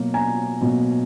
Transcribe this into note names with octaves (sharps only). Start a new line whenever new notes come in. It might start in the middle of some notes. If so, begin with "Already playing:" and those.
Already playing: B2 F#3 A#3
G#5 A#5
B2 F#3 A#3